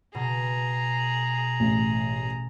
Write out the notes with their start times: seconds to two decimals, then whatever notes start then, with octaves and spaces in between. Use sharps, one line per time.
0.15 B2 G#4 A#5
1.60 A1